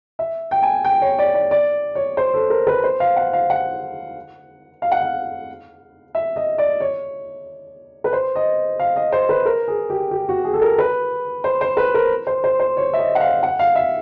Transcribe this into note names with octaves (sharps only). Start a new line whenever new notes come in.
E5
G5
G#5
G5
C#5
D5
D5
D5
C#5
C5
A4
A#4
B4
C5
F5
F#5
F5
F#5
F5
F#5
F5
E5
D#5
D5
C#5
B4
C5
D#5
F5
D#5
C5
B4
A#4
G#4
G4
G4
F#4
G#4
A4
A#4
B4
C5
C5
B4
A#4
C5
C5
C5
C#5
E5
D#5
F#5
F5
F#5
F5
E5